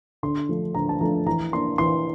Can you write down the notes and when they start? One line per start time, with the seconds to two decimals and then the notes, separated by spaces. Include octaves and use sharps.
0.23 D3 C6
0.49 F3 A3 D4
0.75 D3 A#5
0.89 A5
1.01 F3 A3 D4 A#5
1.26 E3 A#5
1.52 A#3 D4 C6
1.78 E3 C6